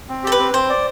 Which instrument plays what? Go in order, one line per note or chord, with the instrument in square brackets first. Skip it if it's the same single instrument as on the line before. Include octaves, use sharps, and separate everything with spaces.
[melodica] C4
[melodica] G4 [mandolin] A4
[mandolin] B4
[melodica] C4
[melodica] C4 [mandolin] C5
[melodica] D5